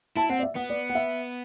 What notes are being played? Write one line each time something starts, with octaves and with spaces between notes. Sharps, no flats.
E4 A5
C4 F#5
D5
E5
B3 F#5
D5
F#5
E5